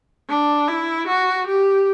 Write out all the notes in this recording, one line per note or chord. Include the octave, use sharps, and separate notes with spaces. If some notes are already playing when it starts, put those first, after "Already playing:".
D4
E4
F#4
G4